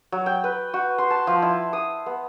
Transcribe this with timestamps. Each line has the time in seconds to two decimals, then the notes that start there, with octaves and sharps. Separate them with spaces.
0.12 F#3
0.26 G5
0.44 B4
0.74 F#4
0.98 C6
1.10 A5
1.27 F3
1.42 E4
1.73 D#6
2.06 B3